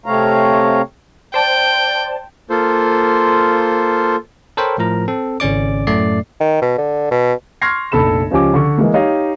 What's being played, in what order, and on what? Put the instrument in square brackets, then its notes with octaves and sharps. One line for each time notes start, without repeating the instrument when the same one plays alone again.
[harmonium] C3 A3 C4 C#5 F5 A#5
[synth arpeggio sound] C5 D5 A5 [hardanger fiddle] G5
[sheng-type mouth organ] A#3 F4 A4 C5
[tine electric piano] A4 A#4 C5 C#5 G5 B5
A2 F3 A#4 A#5
C4 A4
G#1 C#3 C#4 D5 D6
F#2 A2 A3 D5 C7
[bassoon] D#3
B2
D3
B2
[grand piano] C6 C#6 F6 G#6 A#6 C7
F1 A#1 A4 B5 E7
C#2 F3 C#4 G4 G#5 D6
D3 C#6
E3 G#3 A#3
D#4 G4 C#5 D#5 F5